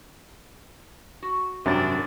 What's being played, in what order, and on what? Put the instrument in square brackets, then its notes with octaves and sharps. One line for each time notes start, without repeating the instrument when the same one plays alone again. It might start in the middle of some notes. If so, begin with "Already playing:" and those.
[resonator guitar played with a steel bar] F#4
[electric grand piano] G#1 C#4 A6 [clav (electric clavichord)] F#2 C3 [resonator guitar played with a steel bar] G3 G5 [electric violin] D4